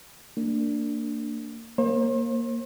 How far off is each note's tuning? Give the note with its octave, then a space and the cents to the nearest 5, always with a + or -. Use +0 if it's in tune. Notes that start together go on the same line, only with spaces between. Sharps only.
A#3 -30 D4 +0
A#3 +0 C5 +45